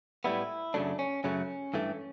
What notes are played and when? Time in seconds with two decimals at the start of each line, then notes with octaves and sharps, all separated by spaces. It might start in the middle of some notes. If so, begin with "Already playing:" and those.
0.24 A2 G3 B3 E4
0.74 F#2 C#3 F#3 A3 D4
0.99 C#4
1.24 F#2 C#3 F#3 A3 C#4
1.74 G2 E3 A3